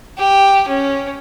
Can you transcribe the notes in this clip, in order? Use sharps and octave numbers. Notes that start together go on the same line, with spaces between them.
G4
C#4